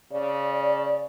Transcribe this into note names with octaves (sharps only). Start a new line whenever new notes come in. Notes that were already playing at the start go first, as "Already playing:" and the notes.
C#3 D5